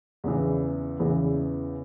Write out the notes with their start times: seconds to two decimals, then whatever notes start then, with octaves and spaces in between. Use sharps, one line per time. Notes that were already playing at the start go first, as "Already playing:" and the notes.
0.24 E2 C#3 E3
1.00 E2 C#3 E3